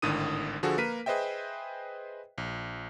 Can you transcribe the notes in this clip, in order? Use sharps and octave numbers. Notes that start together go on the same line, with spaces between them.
G#1 A2 D3 D#3 D#6 D#7
D3 F3 F#4 G#4 A4
A#3 A#4 B4 B6 D#7
G#4 B4 C5 D#5 E5 G5
A#1